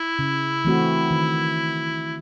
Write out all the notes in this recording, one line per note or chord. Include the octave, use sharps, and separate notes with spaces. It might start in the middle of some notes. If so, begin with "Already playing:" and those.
Already playing: E4
C#3
E3 A3 C4 F#4
D#3